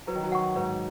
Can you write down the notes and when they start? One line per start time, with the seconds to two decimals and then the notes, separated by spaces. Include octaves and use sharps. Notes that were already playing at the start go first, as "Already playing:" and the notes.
0.07 F#3 B4
0.15 D#3
0.23 F#3
0.32 F#5 C#6
0.56 G#2 B4